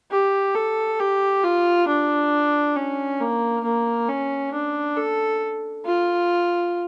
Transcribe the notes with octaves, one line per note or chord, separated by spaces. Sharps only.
G4
A4
G4
F4
D4
C#4
A#3
A#3
C#4
D4
A4
F4